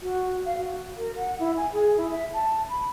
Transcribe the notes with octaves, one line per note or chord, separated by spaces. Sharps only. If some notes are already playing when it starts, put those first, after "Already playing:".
F#4
F5
F#4
A#4
F#5
E4
G#5
G#4
E4
E5
A5
B5